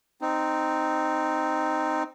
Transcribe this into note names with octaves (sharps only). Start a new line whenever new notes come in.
C4 D#4